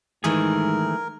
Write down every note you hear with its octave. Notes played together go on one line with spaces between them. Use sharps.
G#2 D#3 E3 G3 A3 G#4 A#4